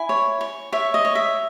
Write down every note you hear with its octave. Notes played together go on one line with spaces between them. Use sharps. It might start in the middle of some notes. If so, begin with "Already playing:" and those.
Already playing: E4 G#5
C#5
C#5
C#5 E5
D#5
C#5
E5